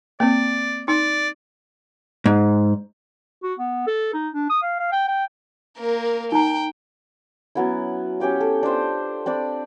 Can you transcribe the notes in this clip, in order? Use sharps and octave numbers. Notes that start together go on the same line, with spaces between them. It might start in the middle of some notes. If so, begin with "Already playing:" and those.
A#3 C4 D5
D#4 D5
G#2
F#4
B3
A4
D#4
D4
D#6
F5
F5
G5
G5
A#3 A#4
D#4 G5 A#5
F#3 B3 C#4 E4
C#4 G4 G5 D6
A4
D4 F4 C5 G5
C4 D4 D5 B5